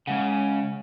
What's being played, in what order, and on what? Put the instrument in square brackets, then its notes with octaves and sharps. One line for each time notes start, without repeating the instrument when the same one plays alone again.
[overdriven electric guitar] C#3 [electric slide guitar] G#3 F#5